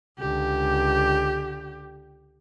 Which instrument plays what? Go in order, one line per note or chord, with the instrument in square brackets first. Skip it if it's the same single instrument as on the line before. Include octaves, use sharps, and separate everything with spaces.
[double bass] C#2 D3 [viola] G4